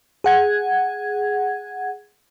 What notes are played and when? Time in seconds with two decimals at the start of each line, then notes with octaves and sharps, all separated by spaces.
0.24 G#4 F#5 G#6